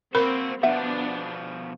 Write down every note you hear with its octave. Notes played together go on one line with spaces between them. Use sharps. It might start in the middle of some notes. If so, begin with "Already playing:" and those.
A#3 C4 F#4 A#4 B5
B2 F3 B3 D4 E5 F#5